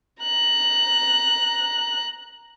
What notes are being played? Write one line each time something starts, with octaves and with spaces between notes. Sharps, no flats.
A#5 F#6